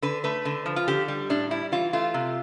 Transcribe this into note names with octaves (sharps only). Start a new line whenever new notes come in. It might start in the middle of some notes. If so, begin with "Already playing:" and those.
D3 B4
A3 B4
D3
F3
F4
D3 G4
G3
A2 D4
G3 E4
E3 F4
A3 F4
C3